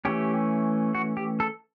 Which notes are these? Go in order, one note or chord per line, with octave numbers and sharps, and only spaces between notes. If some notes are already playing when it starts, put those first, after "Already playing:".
E3 A3 C#4 G4
F#4
G4
A4